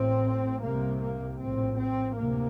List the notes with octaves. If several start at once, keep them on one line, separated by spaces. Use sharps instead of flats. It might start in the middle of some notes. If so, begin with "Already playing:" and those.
Already playing: A1 A2 C4
C2 C3 A#3
A#3
A#1 A2 C4
C4
D2 C3 A#3